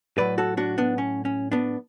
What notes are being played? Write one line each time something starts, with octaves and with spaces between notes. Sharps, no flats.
A2 F#3 B4 D5
F#4 A4
D4 F#4
B3 D4
C#4
C#4
B3 D4